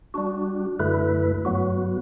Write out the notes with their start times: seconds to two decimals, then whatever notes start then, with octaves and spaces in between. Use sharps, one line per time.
0.14 G3 D4 F#4
0.79 F#2 D3 A3 E4 B4
1.45 G2 F#3 B3 F#4